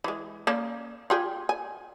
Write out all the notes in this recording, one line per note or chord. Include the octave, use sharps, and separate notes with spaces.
E3 G#3
A#3 C#4 D5
F4 G4 G#4
G#5